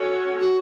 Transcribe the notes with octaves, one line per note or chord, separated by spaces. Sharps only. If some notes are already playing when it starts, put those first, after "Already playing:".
Already playing: C#4 F#4 A4 C#5
F#4